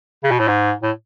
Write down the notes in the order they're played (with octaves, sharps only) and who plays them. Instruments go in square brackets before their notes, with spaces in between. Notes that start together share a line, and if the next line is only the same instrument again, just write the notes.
[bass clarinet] C#3
B2
A2
G#2
A2